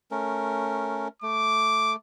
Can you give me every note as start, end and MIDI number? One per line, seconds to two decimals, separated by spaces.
0.11 1.08 57
0.11 1.08 61
0.11 1.08 70
1.22 1.96 57
1.22 1.95 86